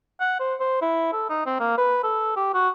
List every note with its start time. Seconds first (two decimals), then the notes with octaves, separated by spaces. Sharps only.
0.20 F#5
0.40 C5
0.60 C5
0.81 E4
1.13 A4
1.29 D#4
1.46 C4
1.60 A#3
1.78 B4
2.03 A4
2.37 G4
2.54 F#4